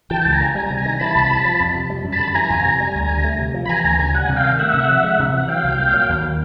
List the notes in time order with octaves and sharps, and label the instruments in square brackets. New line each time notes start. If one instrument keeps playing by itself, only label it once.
[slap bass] E3 [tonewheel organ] G5 A5
[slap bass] C#2 [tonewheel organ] A5
[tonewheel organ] G#5 A#5
[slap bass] C#3
[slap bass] G3 [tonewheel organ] G#5 A#5
[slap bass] C3
[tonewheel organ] G#5 A#5
[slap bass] D#3
[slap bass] E3 [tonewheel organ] A5 B5
[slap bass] C2
C3
F3
F2
C3
G3
F#2
[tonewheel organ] A5 B5
[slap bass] D3
[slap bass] E3 [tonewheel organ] G#5 A#5
[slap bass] F2
C3
G3
D2
D3
A3
C3
F3
[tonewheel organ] B5
[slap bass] E3 [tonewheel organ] G#5 A#5
[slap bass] D2 [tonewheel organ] G#5 A#5
[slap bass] C#3 [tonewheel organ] G#5 A#5
[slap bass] G3 [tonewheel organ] F#5 G#5
[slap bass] C3
[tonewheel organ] F5 G5
[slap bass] D#3
[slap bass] A3 [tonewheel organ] E5 F#5
[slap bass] C3
F3
G#3
C3
[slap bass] E3 [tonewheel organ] F#5
[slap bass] F#3 [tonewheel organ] F5 G5
[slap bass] C2
A#2
F#3
D#2
D#3